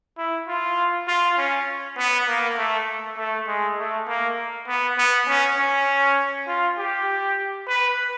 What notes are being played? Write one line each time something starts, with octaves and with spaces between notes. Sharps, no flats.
E4
F4
F4
C#4
B3
A#3
A3
A3
G#3
A3
A#3
B3
B3
C#4
C#4
F4
G4
B4